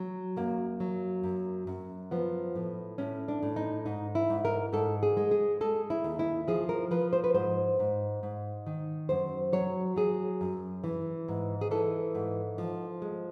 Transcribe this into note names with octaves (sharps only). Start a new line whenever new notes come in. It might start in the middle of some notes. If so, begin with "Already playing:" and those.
Already playing: F#3
F#2 A#3
F#3
F#2
F#2
F3 B3
A2
A2 C#4
D4
A2
D#4
G#2 D#4
E4
G#2
A#4
G#2 A4
G#4
G#3
G#4
G#3 A4
E4
D#2
E4
F3 G#4
A#4
F3 B4
C5
B4
G#2 C5
G#2
G#2
D#3
F#2 C5
F#3 C#5
F#3 G#4
F#2
E3
G#2
G#4
E3 A4
G#2
F3
G#3